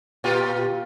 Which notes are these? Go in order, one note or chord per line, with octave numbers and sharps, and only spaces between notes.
A#2 F4 G4